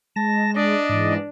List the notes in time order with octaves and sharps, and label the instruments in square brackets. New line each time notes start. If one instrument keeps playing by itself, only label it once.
[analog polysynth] G#3 [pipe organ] A5 A#6
[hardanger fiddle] D4 [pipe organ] D5 D#5
[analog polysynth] G#2 E3